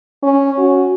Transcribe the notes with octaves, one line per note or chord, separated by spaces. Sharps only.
C#4
F#4